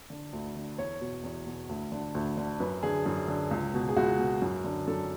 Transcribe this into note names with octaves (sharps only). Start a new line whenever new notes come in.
D3
D2
D3
E2 C#5
B2
E2
B2
D2
D3
D2
D3
F#2 B4
D3 G#4
F#2 G#4
D3
C#2
B2
G#4
C#2 F#4
B2
F#2
D3
F#2 A4